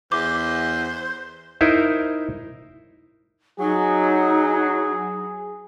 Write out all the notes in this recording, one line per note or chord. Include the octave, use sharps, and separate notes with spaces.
E2 C5 D6
D#4 E4 A#4 C5
F#3 D#4 G#4